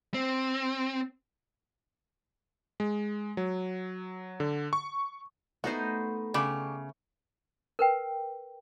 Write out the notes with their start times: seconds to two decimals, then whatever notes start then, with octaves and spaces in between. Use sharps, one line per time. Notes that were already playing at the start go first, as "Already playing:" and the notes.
0.14 C4
2.80 G#3
3.37 F#3
4.40 D3
4.73 C#6
5.64 A3 B3 D#4 F#4 C5
6.34 C#3 D4 G4 B5
7.79 A#4 B4 G5